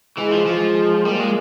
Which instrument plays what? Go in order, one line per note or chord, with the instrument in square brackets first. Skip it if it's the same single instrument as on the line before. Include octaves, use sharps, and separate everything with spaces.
[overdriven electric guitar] E3 [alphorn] G#3
[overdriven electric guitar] F3
[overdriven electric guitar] F3 [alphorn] G#3
[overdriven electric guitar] G3 [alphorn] A#3
[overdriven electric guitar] G#3